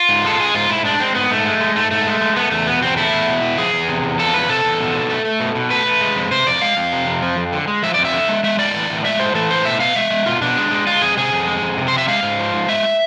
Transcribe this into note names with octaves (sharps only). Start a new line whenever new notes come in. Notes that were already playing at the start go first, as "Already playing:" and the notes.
Already playing: F4
G#2
G#3 A4
G#3 G#4
G#2 F4
G#2 E4
G#3 D4
G#3 C4
G#2 B3
G#2 A3
G#3
G#3
G#2 A3
G#2 A3
G#3
G#3
A3 B3
E2 A3
B2 B3
E2 C4
A3 E4
E2
B2
E2
F3 G#4
E2
C3
E2
F3 A4
E2 B4
C3 A4
E2
B2
B2
A3
A3
B2
B2
A3 B4
A3
G#3
F2
C3 C5
F2 D5
G#3 F5
F2
C3
F2
F3
F2
D3
G#3
F3 E5
F2 D5
E5
D3
G#3
G#3 E5
A2 D5
E3
A2
G#3 E5
A2 C5
E3 A4
A2 C5
B2 E5
B2 F5
G#3 E5
G#3
B2 F4
B2 D4
G#3
G#3
G#3 F4
F2 G#4
C3 G#4
F2
G#3
F2
C3
C5
F2
E5
G#3 F5
G#2
F3
G#2
G#3 E5